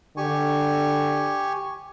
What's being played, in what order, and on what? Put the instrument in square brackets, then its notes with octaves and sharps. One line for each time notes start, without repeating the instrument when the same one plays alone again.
[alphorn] D3 [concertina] G4 G#5 C#6